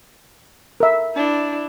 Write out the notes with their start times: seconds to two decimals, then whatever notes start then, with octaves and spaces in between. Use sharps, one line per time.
0.80 A#4 E5
1.15 D4 E4